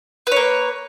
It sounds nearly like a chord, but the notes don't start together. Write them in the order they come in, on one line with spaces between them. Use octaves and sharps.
B4 C#5 A#3